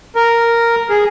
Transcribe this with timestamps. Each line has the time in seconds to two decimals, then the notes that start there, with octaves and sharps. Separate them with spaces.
0.16 A#4
0.90 G#4